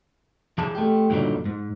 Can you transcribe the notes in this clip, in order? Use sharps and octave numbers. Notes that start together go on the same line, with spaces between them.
E3 G#4 A5
A3 G4
G2 A#2 D3 E3 F#3 D#4
G#2